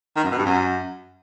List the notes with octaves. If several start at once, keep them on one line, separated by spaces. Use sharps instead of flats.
D#3
F#2
B2
G2
F#2